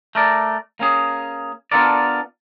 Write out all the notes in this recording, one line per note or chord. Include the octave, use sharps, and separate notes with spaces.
A3 A#4 D5
A#3 C#4 G#4
B3 D4 F4 A4 A#4 D5